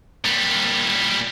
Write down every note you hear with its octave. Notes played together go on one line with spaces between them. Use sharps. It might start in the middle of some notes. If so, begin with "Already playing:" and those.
A#2 G3